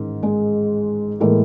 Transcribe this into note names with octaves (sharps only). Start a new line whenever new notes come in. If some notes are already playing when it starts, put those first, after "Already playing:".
Already playing: A1 G#2 D#3
G#3 G#4
A2 E3 G#3 A#3 A#4